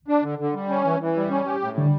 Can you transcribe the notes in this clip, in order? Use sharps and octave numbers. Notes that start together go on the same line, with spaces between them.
D4
D3
D3
G3
C#4
E3
E3
G3
C#4
G4
A2
D3 G3